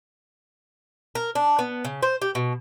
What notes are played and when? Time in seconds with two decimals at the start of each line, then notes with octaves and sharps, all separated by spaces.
1.15 A#4
1.35 D4
1.59 B3
1.85 C#3
2.03 C5
2.22 G4
2.35 B2